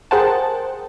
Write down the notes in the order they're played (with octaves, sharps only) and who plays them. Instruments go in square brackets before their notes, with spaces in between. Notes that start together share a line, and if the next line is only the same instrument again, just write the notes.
[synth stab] G#4 A#4 C5 F#5 G5 A5